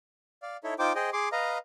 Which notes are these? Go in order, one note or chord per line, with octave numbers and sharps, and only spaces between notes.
D5 F5
D#4 E4 A4 C#5 E5
D#4 F4 C5 G5 D6
G#4 C5 D#5 G5
G#4 C6 D6
B4 D#5 F5 A#5